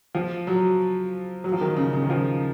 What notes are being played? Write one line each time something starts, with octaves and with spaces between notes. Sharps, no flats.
F3
F#3
F#3
F3
D#3
C#3
C#3
D#3
F3